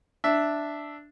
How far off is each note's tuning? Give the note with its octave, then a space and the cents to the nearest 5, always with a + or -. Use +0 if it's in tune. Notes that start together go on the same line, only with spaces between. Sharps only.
D4 +0 E5 +0